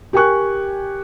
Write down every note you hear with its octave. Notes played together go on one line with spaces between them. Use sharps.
G4 A#4 G5 G#5 C#6 F#6